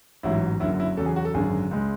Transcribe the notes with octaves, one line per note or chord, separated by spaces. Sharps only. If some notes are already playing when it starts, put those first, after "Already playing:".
A1 G#2 F#3 E4
F#1 F#2 D3 F#3 E4
E4
E2 C#3 F#3 A4
G#4
F#4
A4
G#1 F#2 D3 F#3 G#4
C#2 C#3 G#3